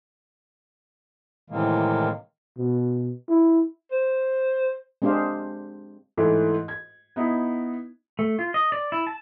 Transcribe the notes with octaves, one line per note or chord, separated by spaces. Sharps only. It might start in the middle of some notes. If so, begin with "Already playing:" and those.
A2 C3 D#3 E3 G#3 A#3
B2
E4
C5
G#3 C4 D4 G4 C5 F5
G#2 E3 A3
G#6
B3 D#4 E4
A3
F4
D#5
D5
E4
A5